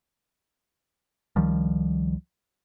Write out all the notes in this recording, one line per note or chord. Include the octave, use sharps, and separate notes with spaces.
C#2 D#3 F3 G3